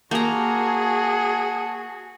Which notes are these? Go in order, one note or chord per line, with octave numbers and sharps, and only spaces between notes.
A#3 F#4 G#4 A5 A#5